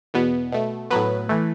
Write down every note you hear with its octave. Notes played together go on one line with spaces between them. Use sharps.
E2 B2 B3
B2 A3
A2 F#3 B3 B4
E3 A3